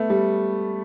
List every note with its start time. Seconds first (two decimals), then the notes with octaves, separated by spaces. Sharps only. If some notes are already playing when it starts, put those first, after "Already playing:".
Already playing: A3 B3
0.10 G3